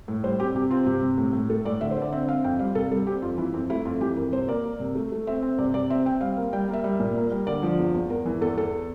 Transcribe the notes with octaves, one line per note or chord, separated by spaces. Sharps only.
A2
G3 C5
C4 G4
C3 G4
C4 F4
C3 G4
C3
A2
A2
A3 A4
A2 D5
D3 E5
C5
D3
D5
C4 E5
C4 F5
F2 G5
G3 F5
C3 A4
G3 A4
C4 G4
F2 F4
E3 E4
F2 C4
A3 E4
F2 F4
E3 G4
F2 A#4
C3 C5
A#3 D5
A#3
C3
A3
A3
C4 E5
C4
C3 D5
C3 D5
C4 E5
C4 G5
G3 F5
A#3
G3 G5
A#3 E5
G3
A#2
A#3
G3
D3 D5
F3
E2
E2
E2 A#4
E3
E2 A4
E2 A4